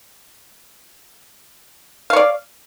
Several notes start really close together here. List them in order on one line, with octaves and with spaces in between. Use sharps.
F5 C#5 D5